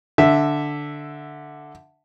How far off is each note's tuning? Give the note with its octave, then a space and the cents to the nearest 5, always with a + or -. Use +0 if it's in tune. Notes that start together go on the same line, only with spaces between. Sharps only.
D3 +0 E5 +0